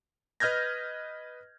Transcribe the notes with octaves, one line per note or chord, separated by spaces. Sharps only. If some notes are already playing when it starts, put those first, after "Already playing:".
B4 D#5 F6 G6 G#6 A#6